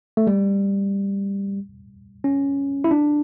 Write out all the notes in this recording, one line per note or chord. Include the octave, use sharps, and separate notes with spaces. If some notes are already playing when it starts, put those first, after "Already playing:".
A3
G3
C#4
E4
D4